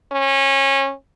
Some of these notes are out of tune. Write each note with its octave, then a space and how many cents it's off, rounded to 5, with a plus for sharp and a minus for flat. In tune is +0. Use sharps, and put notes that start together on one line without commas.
C#4 -25